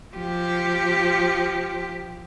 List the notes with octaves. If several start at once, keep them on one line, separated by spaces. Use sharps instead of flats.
F3 G4